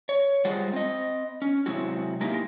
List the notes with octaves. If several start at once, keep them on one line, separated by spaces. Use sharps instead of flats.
C#5
G3 G#3 F4 G#4 C5 F#5
C4 D#5
C#4
C3 F#3 G#3 C4 E4 F#4
G#3 A#3 D#4 E4 G4